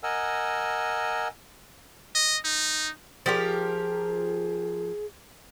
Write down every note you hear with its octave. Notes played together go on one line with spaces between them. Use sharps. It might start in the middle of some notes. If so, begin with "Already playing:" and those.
A#4 D#5 F#5 G#5 E6
D#5
D#4
F3 G4 G#4 A#4